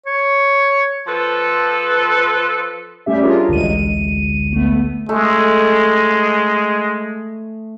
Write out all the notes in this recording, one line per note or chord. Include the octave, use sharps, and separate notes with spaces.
C#5
F3 A4 B4
G3 A3 C#4 G4 E5
D4 F4 G#4 A#4 C#5
A1 D2 D3 G#3 D#7
A3 B3
G#3 A3